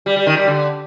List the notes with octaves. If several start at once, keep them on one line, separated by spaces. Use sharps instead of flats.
G3
G3
D#3
G3
D3